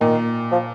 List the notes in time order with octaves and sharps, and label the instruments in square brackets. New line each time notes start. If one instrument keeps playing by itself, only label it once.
[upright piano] A#2 [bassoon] D#3
[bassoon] F3